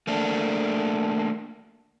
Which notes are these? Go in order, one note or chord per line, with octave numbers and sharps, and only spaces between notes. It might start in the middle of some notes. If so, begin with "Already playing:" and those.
A3 A#3 D4